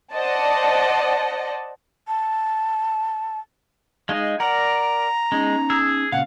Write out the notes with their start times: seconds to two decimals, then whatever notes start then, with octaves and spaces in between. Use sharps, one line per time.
0.15 C5 D5 D#5 F#5 A5
2.08 A5
4.09 G#3 D#4 F5
4.40 A#4 D5 F#5 A#5
5.32 G#3 C#4 D#4
5.70 G#4 E6
6.12 A#2 C#3 F5 F#5